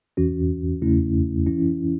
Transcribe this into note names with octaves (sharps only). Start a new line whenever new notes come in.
E2 E3 C#4 F#4
E2 C#3 A3 C#4 E4
E3 C#4 E4